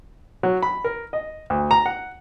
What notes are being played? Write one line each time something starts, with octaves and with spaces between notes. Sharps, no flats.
F#3
B5
A#4
D#5
D2
A#5
F#5